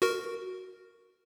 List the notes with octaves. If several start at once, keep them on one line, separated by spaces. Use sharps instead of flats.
F#4 A#4